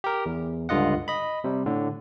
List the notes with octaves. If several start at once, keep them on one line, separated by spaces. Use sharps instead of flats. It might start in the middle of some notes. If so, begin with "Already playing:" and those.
G4 A#4
E2
C#2 G2 D3 F4 D#5 F#5
D#5 B5
C3 G3
A2 D3